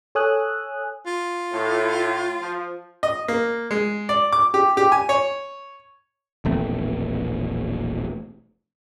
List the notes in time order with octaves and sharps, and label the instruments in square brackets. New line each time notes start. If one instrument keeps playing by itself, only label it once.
[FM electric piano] A4 C#5 G#5 D#6 E6 F#6
[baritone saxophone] F4
[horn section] A2
F3
[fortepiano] D#5
A#3
G#3
D5
D6
G4
G4
G#5
C#5
[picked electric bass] E1 A#1 A3 C4